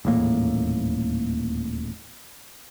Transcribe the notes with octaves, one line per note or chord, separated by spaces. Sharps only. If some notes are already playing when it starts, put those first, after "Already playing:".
D#1 E2 A2 A#3